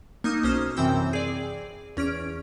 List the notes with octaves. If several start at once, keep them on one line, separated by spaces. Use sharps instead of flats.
A#3 D#4 D#6 E6
B1 C#4 C5 D#6 F6
F#2 C3 E3 C4 G5 E6
G#4 D5
E2 C#4 F6 D7